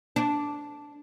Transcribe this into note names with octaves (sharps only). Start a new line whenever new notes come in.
D4